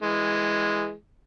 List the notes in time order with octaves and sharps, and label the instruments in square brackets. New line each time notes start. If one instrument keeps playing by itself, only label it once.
[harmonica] E3 G#3